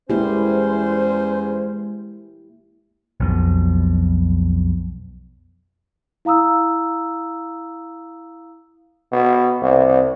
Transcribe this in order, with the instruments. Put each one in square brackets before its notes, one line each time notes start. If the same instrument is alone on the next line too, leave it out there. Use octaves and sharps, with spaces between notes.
[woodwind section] E2 C#4 C5 [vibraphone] G#3 [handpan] A#3 E4 G4
[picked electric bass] B1 F2 B2
[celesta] E4 F5 A#5 D#6 E6
[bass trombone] B2
C2